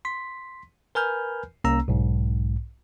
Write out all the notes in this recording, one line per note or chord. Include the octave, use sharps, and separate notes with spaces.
C6 B6
A#4 B4 G#5 B5 F6 G6
C2 A#3 C#4 A#5 E6
B1 G#2